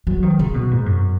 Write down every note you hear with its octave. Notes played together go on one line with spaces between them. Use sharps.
F#3
D#3
C#3
B2
G#2
F#2